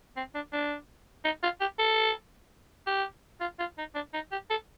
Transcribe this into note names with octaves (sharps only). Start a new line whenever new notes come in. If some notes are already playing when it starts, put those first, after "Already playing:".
C4
D4
D4
D#4
F4
G4
A4
G4
F4
F4
D#4
D4
D#4
G4
A4